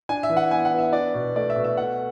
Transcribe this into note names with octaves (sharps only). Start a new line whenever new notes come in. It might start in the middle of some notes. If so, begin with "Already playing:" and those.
D4 G#5
E5
E3
F#5
B3 G#5
F#5
B3
E5
D4 D5
B2
A3 D5
E5
B2
E5
A3 F#5